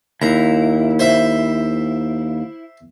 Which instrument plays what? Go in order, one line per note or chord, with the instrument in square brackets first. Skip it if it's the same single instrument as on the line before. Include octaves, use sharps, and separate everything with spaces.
[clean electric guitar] D#2 [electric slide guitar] E4 [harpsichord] A#5
[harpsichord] C5 E5